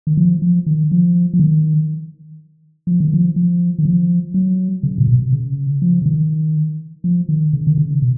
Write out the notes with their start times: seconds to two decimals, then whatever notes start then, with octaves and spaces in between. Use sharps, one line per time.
0.07 D#3
0.17 F3
0.42 F3
0.66 D#3
0.92 F3
1.34 F3
1.39 D#3
2.87 F3
3.00 D#3
3.14 F3
3.36 F3
3.79 D#3
3.85 F3
4.34 F#3
4.83 C#3
4.98 A#2
5.08 B2
5.33 C#3
5.82 F3
6.02 C#3
6.06 D#3
7.04 F3
7.29 D#3
7.53 C#3
7.67 D#3
7.78 C#3
8.02 B2